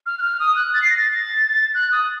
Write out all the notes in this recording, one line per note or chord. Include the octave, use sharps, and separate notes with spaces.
F6
F#6
F6
D#6
F#6
A6
C7
A#6
A6
F#6
D#6